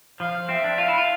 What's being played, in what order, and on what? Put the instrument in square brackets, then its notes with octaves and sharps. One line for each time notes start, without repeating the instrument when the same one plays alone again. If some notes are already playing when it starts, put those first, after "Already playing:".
[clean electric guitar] F3 [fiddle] F5
[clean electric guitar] C4 [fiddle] E5
[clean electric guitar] D4
[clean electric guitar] F4 [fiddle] F5
[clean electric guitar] E4
F4